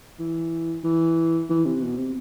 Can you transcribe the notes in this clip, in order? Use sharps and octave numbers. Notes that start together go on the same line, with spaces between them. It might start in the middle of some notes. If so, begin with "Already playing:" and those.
E3
E3
E3
C3
B2
C3